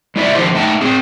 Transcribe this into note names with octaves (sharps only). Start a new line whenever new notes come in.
G#3 E4 D5 E5
D3 D#3 F3 G4 C5
A2 A3 D#4 D#5 G5 A5
C4 G#4